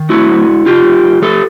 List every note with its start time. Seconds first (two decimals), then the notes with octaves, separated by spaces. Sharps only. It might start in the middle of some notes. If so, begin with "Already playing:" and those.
Already playing: D#3
0.09 A3 E4 F#4
0.29 F#3
0.47 G#2
0.66 C#3 F4 G4
0.84 F#2
1.04 F#2
1.22 F3 G4 A4